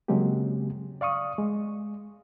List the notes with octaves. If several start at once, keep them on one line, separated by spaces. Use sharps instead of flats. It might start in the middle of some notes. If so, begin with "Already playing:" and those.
C#3 F#3 G#3 A#3 C4 G4
D5 F5 C#6 D#6
G#3